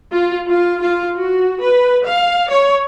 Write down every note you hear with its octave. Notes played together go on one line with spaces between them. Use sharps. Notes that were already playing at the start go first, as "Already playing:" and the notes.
F4
F4
F4
F#4
B4
F5
C#5